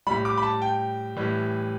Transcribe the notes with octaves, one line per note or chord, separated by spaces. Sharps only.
A2 G3 B5
D6
B5
A5
G5
A2 E3 G3